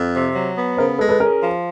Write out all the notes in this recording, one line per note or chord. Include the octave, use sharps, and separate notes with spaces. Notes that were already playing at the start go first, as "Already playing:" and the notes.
Already playing: F2
C3
F#3
B3
C#3 A#4 C5
G#3 A4 B4
A4 B4
C#4 G#4 A#4
F3